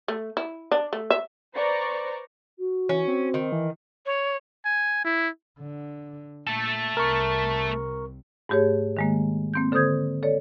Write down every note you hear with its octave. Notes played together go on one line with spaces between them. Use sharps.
A3
E4
D4
A3
E5
B4 C5 D5 A#5 C#6
F#4
E3 C#4
C4
D#3
E3
C#5
G#5
E4
D3
A#2 A3 A4
C2 C3 A#4 C#6
G#2 A3 G4 G#4 C#5
D#3 G#3 A#3
A#3 C4 G6
D3 A4 C5 D#6 G6 G#6
A4 C#5 D5